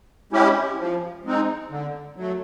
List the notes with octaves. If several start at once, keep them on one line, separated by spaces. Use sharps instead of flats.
G#3 C#4 E4 G4
F3
G#3 C4 D#4
D3
F#3 A3